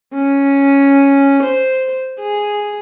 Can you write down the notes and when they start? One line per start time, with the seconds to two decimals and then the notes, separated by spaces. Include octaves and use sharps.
0.14 C#4
1.43 C5
2.20 G#4